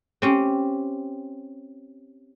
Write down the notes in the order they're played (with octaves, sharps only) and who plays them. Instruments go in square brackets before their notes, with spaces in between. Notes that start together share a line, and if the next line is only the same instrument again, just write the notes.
[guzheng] C4 C#4 G4